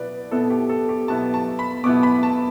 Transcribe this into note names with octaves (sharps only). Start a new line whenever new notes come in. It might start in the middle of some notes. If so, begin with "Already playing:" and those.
Already playing: B2 B3 E4 B4 D5
B2 B3 E4 A4
G4
A4
G4
B2 B3 E4 A5
A5
B5
B2 B3 E4 D6
B5
A5